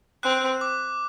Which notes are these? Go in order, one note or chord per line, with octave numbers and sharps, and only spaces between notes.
C4 F#6
D6